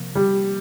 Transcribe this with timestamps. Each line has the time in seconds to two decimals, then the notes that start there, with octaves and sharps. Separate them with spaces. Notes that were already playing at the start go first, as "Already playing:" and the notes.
Already playing: C3 F3 A#3
0.15 G3